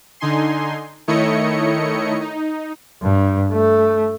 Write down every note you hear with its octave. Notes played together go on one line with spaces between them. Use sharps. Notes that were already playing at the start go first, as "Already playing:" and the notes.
D3 D#4 G#5 C6
D#3 A3 E4 C#5 D#5 C#7
D#4
G2
A3